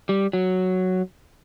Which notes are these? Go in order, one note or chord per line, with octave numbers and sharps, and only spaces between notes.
G3
F#3